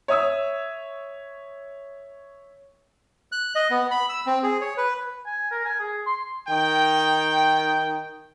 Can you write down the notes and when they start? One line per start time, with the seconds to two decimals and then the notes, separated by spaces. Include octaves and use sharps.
0.08 C#5 E5 D#6 E6
3.32 F#6
3.55 D#5
3.70 B3
3.91 B5
4.09 E6
4.26 C4
4.43 G#4
4.61 C#5
4.77 B4
5.26 G#5
5.51 A#4
5.65 G#5
5.80 G#4
6.06 C6
6.47 D#3 G5